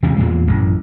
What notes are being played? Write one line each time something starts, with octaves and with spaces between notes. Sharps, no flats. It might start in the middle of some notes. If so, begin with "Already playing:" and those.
D#2 C3 F3 G#3
E2 A#2 G#3
A1 F#2